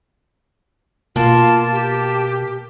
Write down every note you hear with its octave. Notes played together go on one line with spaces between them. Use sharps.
B2 A#3 F4 A5
G4